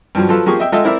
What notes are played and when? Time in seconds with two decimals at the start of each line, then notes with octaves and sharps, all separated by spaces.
0.15 G2 F3 F#3
0.29 F3 F#3 F4 A4 B4
0.46 F3 A#3 G4 G#4 C#6
0.60 D#5 E5 G5
0.72 G#3 F4 A4 D#5 E5 G5
0.84 C4 E4 A#4 D5 E5